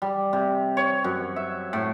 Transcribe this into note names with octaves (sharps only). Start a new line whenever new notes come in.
G3
C3
C#5
F#2
E5
A2